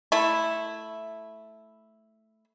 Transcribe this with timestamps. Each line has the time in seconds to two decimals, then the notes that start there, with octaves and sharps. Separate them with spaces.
0.12 A3 E4